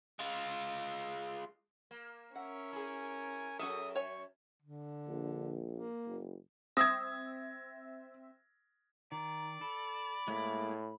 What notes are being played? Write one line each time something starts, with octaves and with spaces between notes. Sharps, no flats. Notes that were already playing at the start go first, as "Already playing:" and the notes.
G#3 F4
A#3
C#4 A#4 E5 F#5
E4 G#4 G#5
F#2 F#4 G#4 A4 E5 D#6
C#5 G#5 C#6
D3
A#1
A#3
F#1
C4 E5 D#6 G#6 A#6
D#3 D5 A#5
A4 B5
A2 G#3 A#3 E4